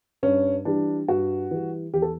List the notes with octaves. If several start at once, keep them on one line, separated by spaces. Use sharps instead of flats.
G2 C#4
E3 G3 D4
G2 F#4
E3 G3
E2 G4
A4